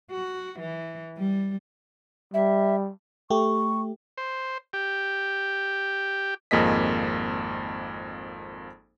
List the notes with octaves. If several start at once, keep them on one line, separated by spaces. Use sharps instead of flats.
F#4
E3
G3
G3 E5
A3 G4 C#6
C5
G4
G#1 F2 A#3 G#4 D#5 B6